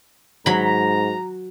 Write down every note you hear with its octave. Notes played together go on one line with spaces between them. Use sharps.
G#2 F#3 A#5 B5